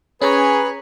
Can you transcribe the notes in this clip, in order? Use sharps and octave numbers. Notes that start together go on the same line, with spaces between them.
C#4 G#4 B4 C#5 G#5 A#5